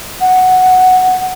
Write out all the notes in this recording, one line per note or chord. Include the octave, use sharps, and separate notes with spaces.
F#5